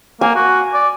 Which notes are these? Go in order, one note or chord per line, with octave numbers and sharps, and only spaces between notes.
A#3 G#5
F#4
D5